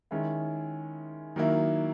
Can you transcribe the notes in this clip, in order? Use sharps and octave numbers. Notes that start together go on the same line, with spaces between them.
D#3 G#3 C#4 E4
D#3 F#3 A#3 E4